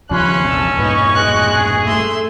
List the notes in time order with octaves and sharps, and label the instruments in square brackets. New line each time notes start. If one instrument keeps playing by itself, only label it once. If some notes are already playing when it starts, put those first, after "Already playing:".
[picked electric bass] D#2 C#3 F3 [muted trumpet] C#4 [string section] B5 C6 F#6
[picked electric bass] A#1 E2 C3 [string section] A5 E6
[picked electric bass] E1 G2 A#2 [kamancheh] D#4 B4 [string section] D#5 C#6
[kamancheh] G#3 F#6
[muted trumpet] G#4
[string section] A3 [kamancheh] E5 C6